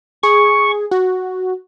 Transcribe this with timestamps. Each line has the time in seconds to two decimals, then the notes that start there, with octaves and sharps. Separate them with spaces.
0.23 G#4 C#6
0.91 F#4